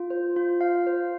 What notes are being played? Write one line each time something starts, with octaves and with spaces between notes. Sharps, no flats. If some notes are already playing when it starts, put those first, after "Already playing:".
Already playing: F4
C5
F4
F5
C5